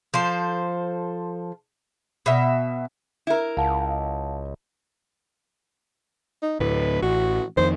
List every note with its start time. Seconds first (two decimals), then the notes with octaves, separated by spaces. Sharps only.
0.14 F3 A4 C5
2.26 B2 E5
3.27 E4 A#4
3.57 C#2 F5 F#5 A5
6.43 D#4
6.60 D2 A2 B4
7.02 A1 F#4
7.57 F2 D#3 C5